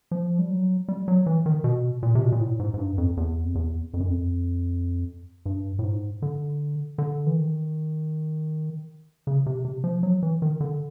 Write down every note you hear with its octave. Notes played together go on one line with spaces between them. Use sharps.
F3
G3
F#3
G3
F#3
E3
D#3
B2
A#2
C3
B2
A#2
A2
G#2
G#2
G2
F2
E2
F2
E2
F2
F#2
F2
G2
A2
G#2
D3
D3
E3
D#3
C#3
C3
C3
F3
F#3
E3
D#3
D3